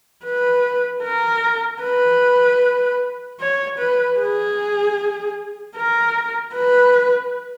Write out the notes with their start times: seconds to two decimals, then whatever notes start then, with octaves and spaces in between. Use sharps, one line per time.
0.24 B4
1.03 A#4
1.82 B4
3.40 C#5
3.79 B4
4.19 G#4
5.77 A#4
6.55 B4